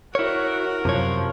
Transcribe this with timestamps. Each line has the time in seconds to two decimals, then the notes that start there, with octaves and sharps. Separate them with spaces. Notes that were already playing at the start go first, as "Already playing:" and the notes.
0.15 E4 F#4 A#4 C#5
0.85 F#2 C3 F3 C#5